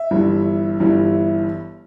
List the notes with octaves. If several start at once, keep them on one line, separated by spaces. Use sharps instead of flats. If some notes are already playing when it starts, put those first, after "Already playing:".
Already playing: E5
G1 G2 E3
G1 G2 E3